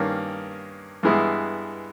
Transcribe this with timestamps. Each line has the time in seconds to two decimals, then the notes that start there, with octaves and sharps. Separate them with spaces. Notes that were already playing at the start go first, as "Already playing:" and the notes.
Already playing: G2 D#3 A#3 C#4
1.03 G2 E3 G#3 B3 E4